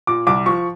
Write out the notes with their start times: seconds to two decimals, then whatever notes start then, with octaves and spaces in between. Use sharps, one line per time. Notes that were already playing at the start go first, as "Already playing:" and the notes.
0.07 A#2 D6
0.27 C2 D6
0.46 F3 C#6